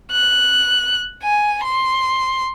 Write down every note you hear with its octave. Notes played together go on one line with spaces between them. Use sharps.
F#6
G#5
C6